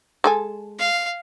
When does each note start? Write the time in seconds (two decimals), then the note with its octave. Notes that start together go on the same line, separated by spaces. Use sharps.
0.24 G#3 A4 G#5
0.79 F5